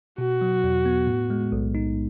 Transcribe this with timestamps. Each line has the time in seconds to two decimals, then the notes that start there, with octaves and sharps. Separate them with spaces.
0.18 B2 F#4
0.41 F#3
0.64 E2
0.86 B3
1.07 A2
1.30 G#3
1.52 B1
1.75 D#4